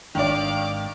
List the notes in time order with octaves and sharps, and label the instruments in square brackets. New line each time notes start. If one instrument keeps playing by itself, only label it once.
[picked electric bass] G#1 G#2 D4 [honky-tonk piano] D#3 D5 [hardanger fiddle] F5 D6